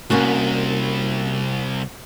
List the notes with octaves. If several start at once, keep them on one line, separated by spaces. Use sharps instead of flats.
C2 A#3 C#4 F#4